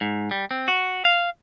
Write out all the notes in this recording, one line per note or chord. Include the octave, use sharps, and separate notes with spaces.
G#2
G3
C4
F#4
F5